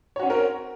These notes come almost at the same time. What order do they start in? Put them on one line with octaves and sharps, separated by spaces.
C#5 F#4 C#4 C4 A#4